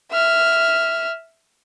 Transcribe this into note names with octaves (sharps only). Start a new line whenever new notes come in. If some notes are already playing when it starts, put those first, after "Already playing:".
E5 F6